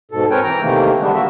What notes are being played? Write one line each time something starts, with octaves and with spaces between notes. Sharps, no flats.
G#2 B2 A4
C4 A#4 B4 C#5 G5 G#5
E3 G5 A#5
C3 D#3 E3 A3 A#3
D3 G3 G#3 B3 D4
A#3 F#4 E5